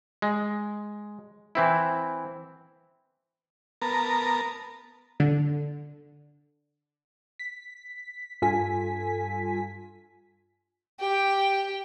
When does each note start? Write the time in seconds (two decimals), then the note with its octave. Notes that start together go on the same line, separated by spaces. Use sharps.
0.22 G#3
1.55 E3 C4 E4
3.82 B3 A#4 A5 A#5
5.20 D3
7.39 B6
8.42 G2 F4 A4 G#5 B6
11.00 G4 G5